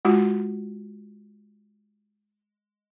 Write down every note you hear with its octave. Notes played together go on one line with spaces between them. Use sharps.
G#3 F4 F#4